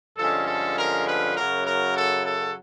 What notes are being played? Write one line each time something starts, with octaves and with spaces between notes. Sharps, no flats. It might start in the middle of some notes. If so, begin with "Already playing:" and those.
G2 D3 F3 G#3 C#4 A4
A4
A#4
B4
F#2 C#3 F#3 A#4
A#4
A4
A4